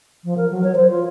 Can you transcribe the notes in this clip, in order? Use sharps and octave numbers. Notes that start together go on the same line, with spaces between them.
F3
A#4
F#3
C#5
C5
F4